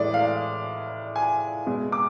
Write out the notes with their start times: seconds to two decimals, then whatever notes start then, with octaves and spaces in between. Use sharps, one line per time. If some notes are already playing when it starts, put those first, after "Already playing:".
Already playing: A2 E3 G#3 D5
0.14 F5
1.16 G#5
1.67 B2 G#3
1.92 D6